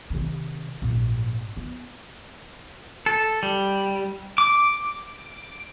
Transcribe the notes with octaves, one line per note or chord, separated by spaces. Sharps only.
C3 D#3
A#1 G#2
B3
A4
G3
D6